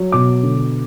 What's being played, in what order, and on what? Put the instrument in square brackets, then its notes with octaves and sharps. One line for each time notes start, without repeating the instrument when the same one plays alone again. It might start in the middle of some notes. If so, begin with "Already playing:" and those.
Already playing: [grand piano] F#3
B2 D6
D3